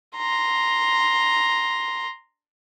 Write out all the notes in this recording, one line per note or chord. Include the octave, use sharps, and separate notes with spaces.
A#5 C6